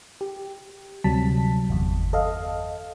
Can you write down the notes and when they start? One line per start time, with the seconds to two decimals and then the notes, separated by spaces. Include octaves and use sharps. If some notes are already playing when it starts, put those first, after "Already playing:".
0.21 G4
1.04 D2 C3 F#3 G3 A5 B6
1.70 G1 E2
2.13 A4 D#5 F5